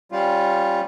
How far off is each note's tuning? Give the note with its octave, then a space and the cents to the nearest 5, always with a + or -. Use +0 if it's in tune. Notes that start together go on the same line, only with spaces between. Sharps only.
G3 +0 C#4 -15 F4 +0